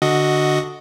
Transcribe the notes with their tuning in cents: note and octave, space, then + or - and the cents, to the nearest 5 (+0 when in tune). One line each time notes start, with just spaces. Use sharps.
D3 +0 F#4 +0 D#5 +5